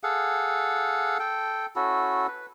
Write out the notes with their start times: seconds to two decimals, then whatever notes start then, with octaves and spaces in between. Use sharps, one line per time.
0.03 G#4 A4 F5 F#5
1.19 A4 G5
1.76 C#4 E4 F#4 A4
2.28 B4